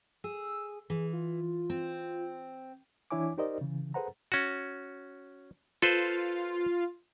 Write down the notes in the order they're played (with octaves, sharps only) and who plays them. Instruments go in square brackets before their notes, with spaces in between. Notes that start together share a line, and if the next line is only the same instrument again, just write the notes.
[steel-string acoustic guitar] G#4 [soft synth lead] E6
[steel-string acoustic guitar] E3 [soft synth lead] G#4
[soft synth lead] F4
[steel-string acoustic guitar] C4
[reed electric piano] E3 D4 E4 C#5 G#5 D6
D#4 G4 A#4 C5 D5 D#5
C#3 E3
G#4 A4 B4 C5 F#5 A#5
[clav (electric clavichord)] C#4 F#4
[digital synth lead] F4 [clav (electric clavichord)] A4 B4 C5